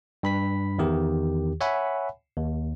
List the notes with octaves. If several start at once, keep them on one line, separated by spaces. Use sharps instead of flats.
G2 B5 B6
E2 D#3 G4
C#5 E5 F#5 G#5 B5
D#2